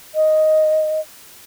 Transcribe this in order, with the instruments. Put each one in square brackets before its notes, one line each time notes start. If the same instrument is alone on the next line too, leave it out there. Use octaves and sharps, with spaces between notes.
[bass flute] D#5